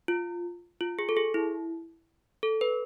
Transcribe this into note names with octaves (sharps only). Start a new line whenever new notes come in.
F4
F4
G#4
A4
G#4
E4
A4
B4